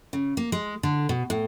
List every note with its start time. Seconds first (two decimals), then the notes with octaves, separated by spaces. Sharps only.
0.13 C#3
0.37 A#3
0.52 G#3
0.83 D3
1.09 B2
1.30 A2